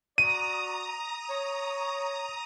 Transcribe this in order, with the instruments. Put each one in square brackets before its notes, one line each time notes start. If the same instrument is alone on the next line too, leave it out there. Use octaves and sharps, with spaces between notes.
[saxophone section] F#4 D5 [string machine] A#5 D#6 [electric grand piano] D#7
[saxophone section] C#5